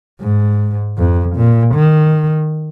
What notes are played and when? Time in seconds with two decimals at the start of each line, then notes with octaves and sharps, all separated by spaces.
0.21 G#2
0.97 F2
1.36 A#2
1.75 D#3